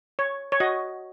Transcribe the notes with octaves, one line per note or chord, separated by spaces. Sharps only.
C#5
C#5
F#4 D#5